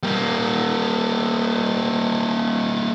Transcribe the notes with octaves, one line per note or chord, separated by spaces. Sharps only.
G3 A#3